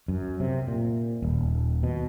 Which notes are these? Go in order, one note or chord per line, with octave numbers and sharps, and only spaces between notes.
F#2
C3
A#2
D#1
B2